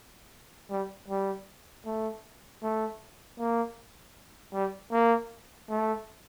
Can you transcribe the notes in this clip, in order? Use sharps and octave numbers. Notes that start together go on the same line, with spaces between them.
G3
G3
A3
A3
A#3
G3
A#3
A3